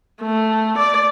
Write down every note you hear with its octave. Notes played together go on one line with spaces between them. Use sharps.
A3
D5